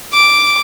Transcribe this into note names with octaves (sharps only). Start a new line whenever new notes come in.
D6